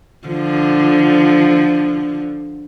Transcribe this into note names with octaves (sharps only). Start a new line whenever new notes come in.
D3 F3